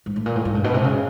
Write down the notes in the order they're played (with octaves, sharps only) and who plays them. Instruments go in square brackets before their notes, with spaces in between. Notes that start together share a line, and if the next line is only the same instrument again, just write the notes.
[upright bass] G#2
A2
A#2
A2
G#2
G2
B2
C3
C#3